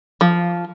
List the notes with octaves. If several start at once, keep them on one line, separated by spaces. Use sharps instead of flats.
F3